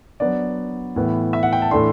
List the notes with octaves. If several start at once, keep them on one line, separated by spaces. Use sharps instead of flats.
F#3 B3 D4 D5
A2 E3 B3
E5
F#5
G5
A5
A2 E3 A3 D4 C6